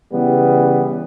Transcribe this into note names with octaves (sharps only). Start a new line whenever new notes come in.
C#3 E3 G3 B3